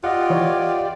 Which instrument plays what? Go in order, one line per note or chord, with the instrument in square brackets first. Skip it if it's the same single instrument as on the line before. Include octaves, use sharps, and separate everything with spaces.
[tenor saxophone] F4 [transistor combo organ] G4 D5 [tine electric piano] D#5 F#5
[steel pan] E3 C#5